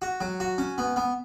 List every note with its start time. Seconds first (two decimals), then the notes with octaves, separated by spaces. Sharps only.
0.02 F#4
0.21 F#3
0.40 F#4
0.58 C#4
0.78 B3
0.96 B3